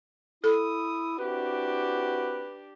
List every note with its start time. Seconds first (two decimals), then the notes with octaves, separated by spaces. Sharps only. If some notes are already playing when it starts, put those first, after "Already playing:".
0.44 E4 A4 D#6
1.19 C4 D4 E4 F#4 G4 B4